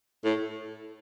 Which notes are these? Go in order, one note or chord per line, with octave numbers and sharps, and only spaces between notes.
A2